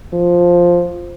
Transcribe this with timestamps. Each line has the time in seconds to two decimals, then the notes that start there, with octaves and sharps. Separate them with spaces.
0.13 F3